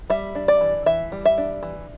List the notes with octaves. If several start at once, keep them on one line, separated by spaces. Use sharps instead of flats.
G3 E5
D4
D5
E3
E3 E5
G3
E5
D4
E3